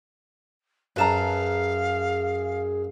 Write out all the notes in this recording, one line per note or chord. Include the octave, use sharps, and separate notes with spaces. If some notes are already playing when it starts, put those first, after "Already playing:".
F#2 G#4 B4 F5 A5 A#5